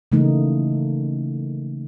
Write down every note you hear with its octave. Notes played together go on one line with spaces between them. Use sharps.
C#3 E3 A3 A#3 D#4